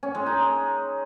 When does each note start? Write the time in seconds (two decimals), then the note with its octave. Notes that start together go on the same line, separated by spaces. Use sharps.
0.03 C#4
0.15 G#3
0.26 D#4